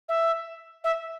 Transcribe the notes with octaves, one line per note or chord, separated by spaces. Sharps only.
E5
E5